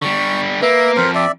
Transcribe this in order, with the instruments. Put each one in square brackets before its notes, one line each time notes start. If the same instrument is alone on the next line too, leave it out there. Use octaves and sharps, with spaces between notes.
[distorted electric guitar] D3 G3 [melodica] C#6
[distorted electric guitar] A#3 [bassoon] B4 [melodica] E5
[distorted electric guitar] F2 [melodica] A#4 C5
[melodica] D5 E5